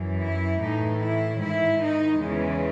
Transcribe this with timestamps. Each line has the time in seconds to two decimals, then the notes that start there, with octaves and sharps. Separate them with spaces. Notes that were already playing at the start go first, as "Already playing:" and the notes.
Already playing: F#2 E3
0.22 E4
0.61 A2 E3 D#4
1.01 E4
1.41 G#2 D#3 E4
1.81 D#4
2.20 E2 C#3 E3 G#3